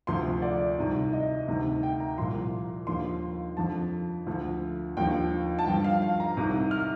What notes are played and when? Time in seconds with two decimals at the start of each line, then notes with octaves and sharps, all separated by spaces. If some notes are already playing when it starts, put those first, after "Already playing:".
0.07 D2 C3 F3 C6
0.42 D5
0.78 C2 C3 D#3
1.13 D#5
1.48 D2 C3 D#3
1.83 G5
2.00 A#5
2.18 C2 A#2 F3 C6
2.87 D#2 D3 F3 C6
3.57 F2 D3 F3 A5
4.27 D2 D3 F3
4.97 D#2 D3 F3 G5
5.59 A5
5.66 G2 D3 F3 G5
5.84 F5
6.02 F5
6.20 A#5
6.37 C2 C3 D#3
6.71 F6